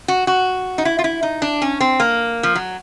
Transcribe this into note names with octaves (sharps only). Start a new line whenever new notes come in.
F#4
F#4
D#4
E4
F4
E4
D#4
D4
C#4
C4
A#3
F3
F#3